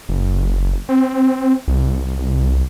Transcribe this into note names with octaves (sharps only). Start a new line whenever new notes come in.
F#1
C4
C2